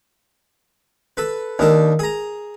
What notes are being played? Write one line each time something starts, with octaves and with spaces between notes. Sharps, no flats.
A4 B4
D#2 D4 A4 A#4
G#4 A#5